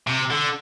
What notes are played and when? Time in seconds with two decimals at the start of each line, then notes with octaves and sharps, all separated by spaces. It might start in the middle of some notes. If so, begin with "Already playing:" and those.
0.07 C3
0.30 D3